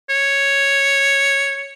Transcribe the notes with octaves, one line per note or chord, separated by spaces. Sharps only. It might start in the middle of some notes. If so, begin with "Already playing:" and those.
C#5